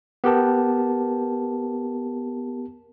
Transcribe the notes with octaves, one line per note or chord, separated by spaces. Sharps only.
B3 G4 A#4 A5